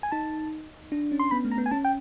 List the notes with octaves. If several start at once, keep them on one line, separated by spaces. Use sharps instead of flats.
G#5
D#4 A5
D4
C#4
C6
B3 B5
A3
A#5
B3
G#5
C#4 A5
G5